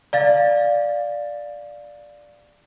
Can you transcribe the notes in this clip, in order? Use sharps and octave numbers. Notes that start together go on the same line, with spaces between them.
D5 F5 A6